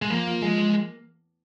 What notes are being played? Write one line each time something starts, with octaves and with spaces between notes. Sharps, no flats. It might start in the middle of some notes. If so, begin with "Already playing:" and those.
G#3
F3 A#3
F4
F3 G#3
A#3